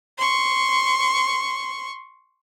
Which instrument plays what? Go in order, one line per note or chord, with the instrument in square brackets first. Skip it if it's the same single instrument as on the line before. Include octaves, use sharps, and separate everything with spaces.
[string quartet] C6 C#6